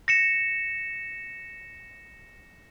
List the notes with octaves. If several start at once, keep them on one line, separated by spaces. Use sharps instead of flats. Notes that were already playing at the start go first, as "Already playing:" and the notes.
A#6 C#7 E7